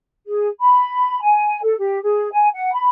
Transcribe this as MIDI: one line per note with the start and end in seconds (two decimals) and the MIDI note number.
0.27 0.47 68
0.60 1.20 83
1.21 1.59 80
1.62 1.76 69
1.78 1.97 67
2.02 2.30 68
2.32 2.48 80
2.53 2.69 78
2.74 2.89 83